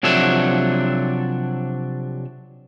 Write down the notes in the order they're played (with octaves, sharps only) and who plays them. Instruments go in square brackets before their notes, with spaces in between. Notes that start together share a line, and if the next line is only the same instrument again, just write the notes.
[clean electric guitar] C3 F3 F#3 D4 A4 E5